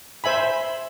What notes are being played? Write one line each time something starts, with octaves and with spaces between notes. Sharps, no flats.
C5 E5 G#5 B5